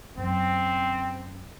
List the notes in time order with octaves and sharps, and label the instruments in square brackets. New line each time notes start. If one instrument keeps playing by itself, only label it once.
[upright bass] F#2 [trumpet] C4